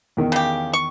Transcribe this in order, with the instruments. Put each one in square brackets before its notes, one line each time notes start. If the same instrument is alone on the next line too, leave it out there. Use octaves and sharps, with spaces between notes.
[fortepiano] E2 D#3
[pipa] C#3 G4
C#6